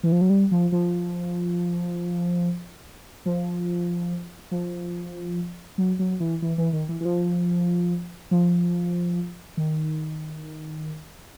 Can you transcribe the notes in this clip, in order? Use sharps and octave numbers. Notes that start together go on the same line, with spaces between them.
E3
F3
F#3
G3
F3
F3
F3
F3
F#3
F#3
E3
E3
E3
D#3
E3
E3
F3
F3
D#3